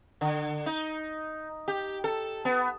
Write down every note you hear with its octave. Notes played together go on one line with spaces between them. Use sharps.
D3
D#4
G4
A4
B3